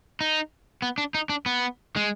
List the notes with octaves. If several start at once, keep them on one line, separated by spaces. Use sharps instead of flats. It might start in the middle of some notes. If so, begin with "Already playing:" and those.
D#4
B3
D4
D#4
D4
B3
G#3